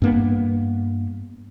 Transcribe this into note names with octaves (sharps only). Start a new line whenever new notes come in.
G2 A#3 B3